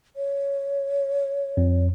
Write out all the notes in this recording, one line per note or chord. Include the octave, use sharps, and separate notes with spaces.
C#5
F2